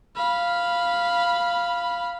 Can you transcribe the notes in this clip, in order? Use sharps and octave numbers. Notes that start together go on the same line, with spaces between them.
F5 B5